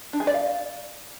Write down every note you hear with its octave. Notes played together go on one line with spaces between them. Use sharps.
D4
G#4
D5
F5